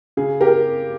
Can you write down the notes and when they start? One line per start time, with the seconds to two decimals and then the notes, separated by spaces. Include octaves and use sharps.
0.17 C#3 G#4
0.41 G4 A#4